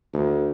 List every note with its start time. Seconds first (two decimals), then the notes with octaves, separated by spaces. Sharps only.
0.14 D2